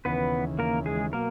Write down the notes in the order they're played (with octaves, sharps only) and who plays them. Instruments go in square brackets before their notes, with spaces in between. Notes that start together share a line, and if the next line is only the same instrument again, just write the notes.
[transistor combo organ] D#2 C#3 E3 [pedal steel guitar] B3 B4
[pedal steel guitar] A#3 A#4
G#3 G#4
[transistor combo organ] B2 F#3 [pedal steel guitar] A#3 A#4